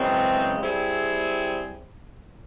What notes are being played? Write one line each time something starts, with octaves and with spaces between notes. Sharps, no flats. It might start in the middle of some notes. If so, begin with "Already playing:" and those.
Already playing: F#2 C#3 E3 G#3 C4
G3 C4 E4 G#4